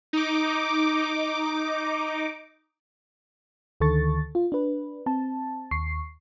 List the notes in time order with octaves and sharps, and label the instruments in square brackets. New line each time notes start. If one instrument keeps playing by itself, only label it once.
[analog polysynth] D#4 D6
[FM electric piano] D2 D3 D#3 A4 C#6 A6
F4
D4 B4
C4 A5
D#2 C#6 C7